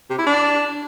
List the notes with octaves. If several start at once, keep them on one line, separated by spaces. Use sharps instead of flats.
C3
E4
D4